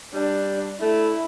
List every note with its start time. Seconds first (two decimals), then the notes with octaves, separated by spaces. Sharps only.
0.13 G3 D4
0.81 A3 E4